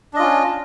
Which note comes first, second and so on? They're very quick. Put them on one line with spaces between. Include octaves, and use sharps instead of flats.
D4 D#5 F4 C#4